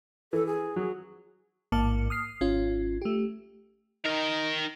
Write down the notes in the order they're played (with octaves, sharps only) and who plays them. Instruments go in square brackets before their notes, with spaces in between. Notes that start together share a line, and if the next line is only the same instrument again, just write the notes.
[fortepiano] E3 [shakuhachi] A4
[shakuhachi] G#4
[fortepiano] F#3
[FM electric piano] A1 G#2 A#3 A5 D6 C#7
D#6 F6 C7
G#1 C#4 F4
A3 G4
[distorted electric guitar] D#3 A#4 [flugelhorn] D#4